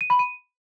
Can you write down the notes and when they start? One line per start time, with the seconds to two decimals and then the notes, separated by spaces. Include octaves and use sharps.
0.01 D#7
0.10 B5
0.19 D#7